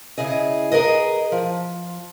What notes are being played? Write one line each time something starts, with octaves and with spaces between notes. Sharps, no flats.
C#3 E4 G#4 D#5
G#4 A#4 B4 D#5
F3